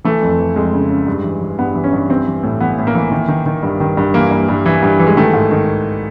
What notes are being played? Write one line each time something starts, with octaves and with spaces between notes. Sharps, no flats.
E3 A3
F2
E3
F2 G#3
C#3
C#3
G2
E3
E3
G2 B3
E3
C#4
G2
E3 C4
E3
A2
E3 B3
A2
A#3
E3
D#3
D#3
D#3
G2
D#3
G2
E3 A#3
G2
G2
E3
G2
E3
G#3
D#3 A3
G#2
D#3